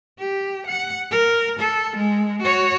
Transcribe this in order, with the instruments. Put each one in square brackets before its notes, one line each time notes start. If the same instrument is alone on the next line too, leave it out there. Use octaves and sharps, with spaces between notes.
[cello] G4
F#5
A#4
A4
G#3
F#4 C#5